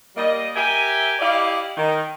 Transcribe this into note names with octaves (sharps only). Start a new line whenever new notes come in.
G3 A#3 D#5
G4 A#4 E5 G5 G#5
E4 G4 D5 D#5 F5
D#3